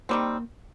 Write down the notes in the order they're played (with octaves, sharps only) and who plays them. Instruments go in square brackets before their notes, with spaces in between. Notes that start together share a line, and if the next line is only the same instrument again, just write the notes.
[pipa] D#3 G3 C4 [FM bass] A#3